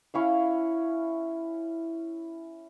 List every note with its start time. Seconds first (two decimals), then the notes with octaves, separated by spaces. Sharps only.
0.14 C#4 E4 F5